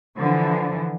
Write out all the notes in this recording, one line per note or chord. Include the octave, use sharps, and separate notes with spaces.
D3 E3 F3